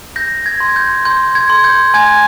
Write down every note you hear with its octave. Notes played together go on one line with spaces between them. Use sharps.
G6 A#6
G#6
C6
G6
C6 G6
G#6
C6
G6
G#5 G#6